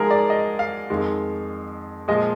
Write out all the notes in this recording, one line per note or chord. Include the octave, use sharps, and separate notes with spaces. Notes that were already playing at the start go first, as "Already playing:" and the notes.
Already playing: G#2 F3 G#3 G#4 A#4
D5
D#5
F5
F2 D#3 G#3
A#2 F3 G#3 D#5